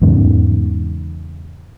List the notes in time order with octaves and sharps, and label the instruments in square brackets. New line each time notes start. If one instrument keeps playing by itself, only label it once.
[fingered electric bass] E2 G#2 C#3